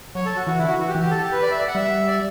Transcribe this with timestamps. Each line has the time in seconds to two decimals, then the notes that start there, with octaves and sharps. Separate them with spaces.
0.15 F#3 C#5
0.26 A4
0.36 F#4
0.47 E3 F#4
0.58 E4
0.63 D3
0.68 F#4
0.79 E3 F#4
0.89 G4
0.95 E3
1.01 G4
1.11 A4
1.22 G4
1.32 B4
1.43 D5
1.51 E5
1.59 D5
1.67 F#5
1.75 G3 E5
2.07 D5